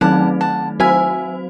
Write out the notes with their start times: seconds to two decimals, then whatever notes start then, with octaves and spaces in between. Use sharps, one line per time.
0.01 D#3 F#3 A3 C4 D#4 F#5 A5
0.41 F#5 A5
0.80 F#3 C4 F#4 C5 E5 G#5